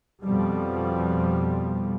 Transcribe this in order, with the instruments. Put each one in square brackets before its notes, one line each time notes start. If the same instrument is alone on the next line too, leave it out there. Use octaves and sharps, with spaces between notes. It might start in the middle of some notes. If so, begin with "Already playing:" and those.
[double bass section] F2 B2 F3 G3